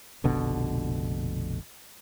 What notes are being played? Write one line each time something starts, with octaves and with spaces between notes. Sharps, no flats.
F1 A#1 B2 D3